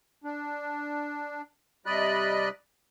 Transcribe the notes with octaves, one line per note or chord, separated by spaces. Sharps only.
D4
C3 G3 D5 D#5 B5 F#6